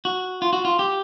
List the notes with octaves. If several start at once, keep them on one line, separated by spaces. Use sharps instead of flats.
F#4
F4
F#4
F4
G4